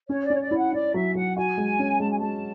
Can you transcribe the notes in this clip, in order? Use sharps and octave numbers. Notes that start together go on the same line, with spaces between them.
C#4 C#5
D5
C#4 C#5
D5
E4
F#5
E4 D5
F#3 E5
F#3 F#5
F#4 G#5
G#3
C#4
G#3 A5
G#5
G#3 A5